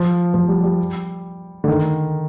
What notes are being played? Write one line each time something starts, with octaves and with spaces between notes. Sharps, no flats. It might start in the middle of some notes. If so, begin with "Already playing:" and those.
Already playing: F3
F3
G3
G3
D3
D#3